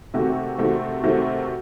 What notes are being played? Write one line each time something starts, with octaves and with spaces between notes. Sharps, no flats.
C3 D#3 A3 C4 F#4
C3 D#3 A3 C4 F#4
C3 D#3 A3 C4 F#4